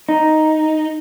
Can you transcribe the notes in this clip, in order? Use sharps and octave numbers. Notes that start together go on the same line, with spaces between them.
D#4